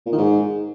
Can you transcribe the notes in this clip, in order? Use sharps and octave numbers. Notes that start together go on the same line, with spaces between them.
A#2
D#3
G#2